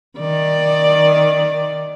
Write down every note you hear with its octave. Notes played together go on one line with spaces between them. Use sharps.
D#3 D5